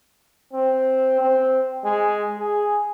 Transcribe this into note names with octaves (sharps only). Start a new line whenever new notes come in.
C4
C4
G#3
G#4